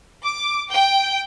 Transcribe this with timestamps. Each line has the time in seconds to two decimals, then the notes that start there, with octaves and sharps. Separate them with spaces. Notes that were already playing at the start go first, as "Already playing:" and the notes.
0.25 D6
0.71 G5